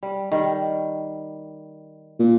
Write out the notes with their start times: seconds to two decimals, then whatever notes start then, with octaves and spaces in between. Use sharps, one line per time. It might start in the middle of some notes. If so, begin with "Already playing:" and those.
0.03 G3
0.32 D#3 G3
2.19 A#2